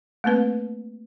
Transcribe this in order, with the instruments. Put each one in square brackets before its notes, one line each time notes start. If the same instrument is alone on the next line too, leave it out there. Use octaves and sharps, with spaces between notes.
[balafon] A3 A#3 C4 B4